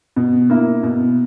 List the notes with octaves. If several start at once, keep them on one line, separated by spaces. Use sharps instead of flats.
B2
A#3 E4
B2